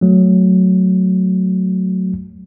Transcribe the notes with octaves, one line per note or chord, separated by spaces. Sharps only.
F#3 A3